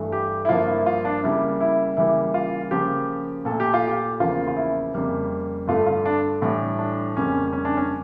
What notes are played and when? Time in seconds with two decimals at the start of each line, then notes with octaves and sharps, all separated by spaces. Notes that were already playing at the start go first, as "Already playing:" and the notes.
Already playing: G2 E3 A3
0.12 G4
0.45 E4
0.49 G2 F3 A#3 F4
0.68 E4
0.86 F4
1.05 D4
1.23 C#3 G3 A#3 E4
1.61 E4
1.97 C#3 E3 G3 A#3 E4
2.34 F4
2.71 C#3 F3 A#3 G4
3.45 A#2 A3 A4
3.60 G4
3.74 F4
3.87 G4
4.20 E2 C#3 F3 A#3 F4
4.48 F4
4.56 E4
4.94 F2 C#3 G3 A#3
5.67 G2 D3 A3 F4
5.86 F4
6.05 D4
6.41 A2 E3 G3 D4
6.79 D4
7.16 F2 C#3 G3 A#3 C#4
7.53 C#4
7.65 D4
7.77 C#4